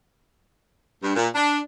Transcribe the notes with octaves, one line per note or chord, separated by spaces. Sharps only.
G2
A#2
D4